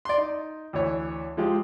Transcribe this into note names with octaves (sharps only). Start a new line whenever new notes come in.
D5 C6
D#4
D2 E3 C#5
F3 G#3 F4 G4